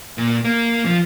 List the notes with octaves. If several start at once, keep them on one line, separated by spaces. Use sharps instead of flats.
A#2
A#3
F3